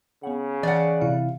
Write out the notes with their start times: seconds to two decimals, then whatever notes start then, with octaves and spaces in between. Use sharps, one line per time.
0.23 C#3 B3 F#5
0.63 E3 D5 F#5
1.01 C3 E4 F5